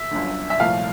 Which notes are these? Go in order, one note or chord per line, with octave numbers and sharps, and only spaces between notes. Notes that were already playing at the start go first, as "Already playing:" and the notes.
Already playing: E5
G1 F#2 D3
E5
C2 A#2 F3 A3 F5